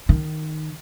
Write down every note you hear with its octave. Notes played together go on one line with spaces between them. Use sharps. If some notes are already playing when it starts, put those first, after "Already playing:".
D#3